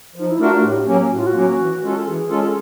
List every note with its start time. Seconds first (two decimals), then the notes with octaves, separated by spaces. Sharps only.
0.16 F3 D#4
0.30 E4
0.39 A3 D4 F4 F#4 A#4
0.52 F#4
0.63 A2 G4
0.87 F#3 A#3 C#4
1.11 A2 F#4
1.19 F4
1.27 F#4
1.34 F#3 A#3 C#4
1.58 E3
1.82 G#3 C#4 F4 A4
2.06 E3 G#4
2.29 G#3 C#4 F4 A4